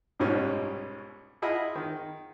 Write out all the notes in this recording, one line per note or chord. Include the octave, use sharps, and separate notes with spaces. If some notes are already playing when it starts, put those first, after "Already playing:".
C2 G#2 B2 G3 C#4 F4
E4 F4 G#4 D#5 F#5 B5
D#3